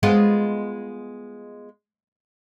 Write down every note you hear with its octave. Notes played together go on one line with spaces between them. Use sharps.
G#3 B3 F4